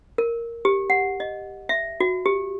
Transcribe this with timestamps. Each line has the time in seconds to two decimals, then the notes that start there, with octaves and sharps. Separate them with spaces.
0.18 A#4
0.65 G4
0.90 F#5
1.20 D#5
1.69 E5
2.00 F#4
2.26 G4